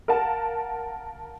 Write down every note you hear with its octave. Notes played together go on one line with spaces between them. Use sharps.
A#4 F5 F#5 A5